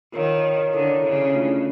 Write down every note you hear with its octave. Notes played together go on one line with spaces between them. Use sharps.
D#3 F4 A#4 C#5 F5
D3 E4 A4 C#5
C#3
A3 D4 F4 A4